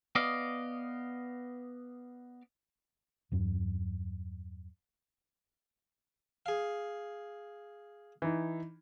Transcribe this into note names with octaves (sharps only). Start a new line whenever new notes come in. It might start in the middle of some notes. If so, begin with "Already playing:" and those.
B3 D5 D#5 F5
E2 G2 F#3
G#4 F5
E3 D#4